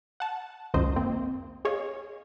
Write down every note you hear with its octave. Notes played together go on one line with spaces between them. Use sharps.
F#5 A5
G#1 C#2 F#2 D#3 C5 D#5
A#3 C4
G#4 C#5 D#5 F5